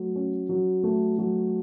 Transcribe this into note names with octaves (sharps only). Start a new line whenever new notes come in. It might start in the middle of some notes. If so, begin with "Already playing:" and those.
Already playing: F#3 A3
C#4
F#3
A3
F#3